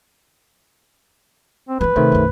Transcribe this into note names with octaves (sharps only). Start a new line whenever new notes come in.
C4
E3 A#3 B4
C3 D#3 A3 C5
B1 F#2